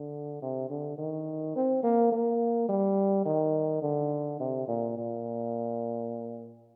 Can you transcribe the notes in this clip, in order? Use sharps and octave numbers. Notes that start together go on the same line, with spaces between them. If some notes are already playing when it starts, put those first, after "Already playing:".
Already playing: D3
C3
D3
D#3
C4
A#3
A#3
G3
D#3
D3
C3
A#2
A#2